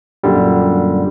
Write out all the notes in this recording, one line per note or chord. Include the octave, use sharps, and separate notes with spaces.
F#2 A#2 D3 G3